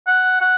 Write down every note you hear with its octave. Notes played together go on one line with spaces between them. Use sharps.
F#5
F#5